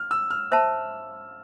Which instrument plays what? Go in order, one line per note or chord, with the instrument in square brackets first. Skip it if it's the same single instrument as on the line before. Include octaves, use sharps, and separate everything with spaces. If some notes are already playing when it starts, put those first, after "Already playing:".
Already playing: [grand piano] F6
E6
F6
[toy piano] C5 E5 A5 [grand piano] E6